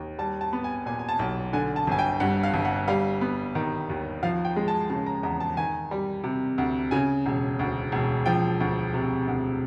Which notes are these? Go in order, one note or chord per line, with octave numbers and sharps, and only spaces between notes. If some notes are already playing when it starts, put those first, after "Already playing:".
Already playing: D#2
G3 A5
A5
B3
G#5
A#2 G#5
G#5
A5
B1
D3 G#5
A5
G1 G#5
G5
G2 F#5
F5
G1
F#5
G3 F5
B3
D#3
D#2
F3 F5
G5
G#3
A5
C#3 A5
A#5
E2 A#5
A5
D#3 G#5
G3
C3
D2
C#3 G#5
E1
D2
E1
F3 G5
D2
C3
D2